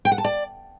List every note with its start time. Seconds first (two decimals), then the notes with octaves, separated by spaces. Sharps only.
0.05 G5
0.12 F#5
0.18 A5
0.24 D5